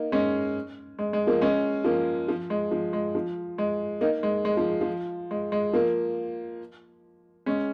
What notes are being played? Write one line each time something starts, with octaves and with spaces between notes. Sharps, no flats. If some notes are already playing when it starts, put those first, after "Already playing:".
Already playing: A#3 D#4
G#3 C#4
G#3
G#3
F3 A#3
G#3 C#4
F3 A#3
F3
G#3
F3
G#3
F3
G#3
A#3 D#4
G#3
G#3
F3
F3
G#3
G#3
F3 A#3
G#3 C#4